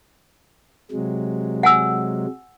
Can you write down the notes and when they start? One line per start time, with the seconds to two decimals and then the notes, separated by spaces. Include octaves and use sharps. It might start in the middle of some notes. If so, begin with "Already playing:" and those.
0.92 C3 F#3 G#3
1.63 F#5 G#5 E6